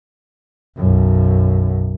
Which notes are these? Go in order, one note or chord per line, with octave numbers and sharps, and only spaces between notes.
B1 F#2